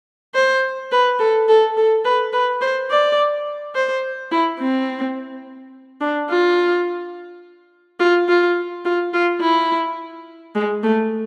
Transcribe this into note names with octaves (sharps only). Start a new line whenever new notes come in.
C5
B4
A4
A4
A4
B4
B4
C5
D5
C5
E4
C4
D4
F4
F4
F4
F4
F4
E4
G#3
A3